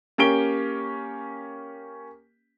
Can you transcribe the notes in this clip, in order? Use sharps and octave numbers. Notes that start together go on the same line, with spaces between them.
A#3 C#4 G4 D7 G7